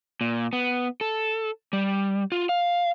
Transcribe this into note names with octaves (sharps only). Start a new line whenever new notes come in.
A#2
B3
A4
G3
F4
F5